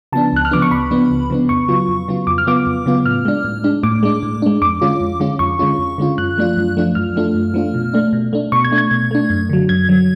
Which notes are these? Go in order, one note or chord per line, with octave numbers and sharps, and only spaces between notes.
C#3 F3 B3 D4 A5
C#2 F#6
F6
C#3 F3 B3 D4 D6
C#6
C#2 B5
C#3 F3 B3 D4
C#2
C#3 F3 B3 D4
F2 C#6
C#3 F#3 B3 F4
F2
C#3 F#3 B3 F4
F2 D6
F6
C#3 F#3 B3 F4 D6
F2
C#3 F#3 B3 F4
A2 F6
G#3 D4
A2
G#3 D4
A2 D6
G#3 D4
A2
G#3 D4
F2 D6
D3 G#3 C#4 F4
F2
D3 G#3 C#4 F4
F2 C#6
D3 G#3 C#4 F4
F2
D3 G#3 C#4 F4
F#2 F#6
F3 A3 D4 F4
F#2
F3 A3 D4 F4
F#2 F6
F3 A3 D4 F4
F#2
F3 A3 D4 F4
B2
A3 D4
B2
A3 D4
B2 C#6
G#6
A3 D4
G#6
B2
A3 D4
F#2
D3 F#3
F#2 G#6
D3 F#3